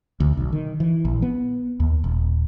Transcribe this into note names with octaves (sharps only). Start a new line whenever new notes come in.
D2
B1
D#3
E3
A#1
B3
D#2
D#1